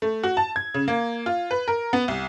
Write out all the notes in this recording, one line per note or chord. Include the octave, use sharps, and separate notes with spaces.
A3
F#4
A5
G#6
C#3
A#3
F4
B4
A#4
B3
C2